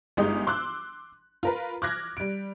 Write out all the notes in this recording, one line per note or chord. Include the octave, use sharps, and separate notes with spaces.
G1 G#3 D#4 G4 D#6
C6 D6 E6 F#6
F4 A#4 B4
D6 F6 F#6 G#6 A#6
G3 D7